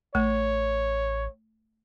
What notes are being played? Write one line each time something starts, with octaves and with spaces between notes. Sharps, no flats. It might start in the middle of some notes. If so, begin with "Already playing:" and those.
A1 A3 C#5